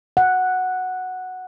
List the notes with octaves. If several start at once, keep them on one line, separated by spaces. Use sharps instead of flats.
F#5